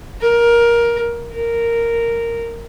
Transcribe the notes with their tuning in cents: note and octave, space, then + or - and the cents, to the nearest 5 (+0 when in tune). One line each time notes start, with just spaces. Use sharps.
A#4 +15
A#4 -5